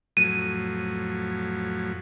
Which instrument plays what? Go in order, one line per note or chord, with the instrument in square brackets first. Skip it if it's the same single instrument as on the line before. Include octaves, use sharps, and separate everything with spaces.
[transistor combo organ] F2 A2 F#3 [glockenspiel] D#7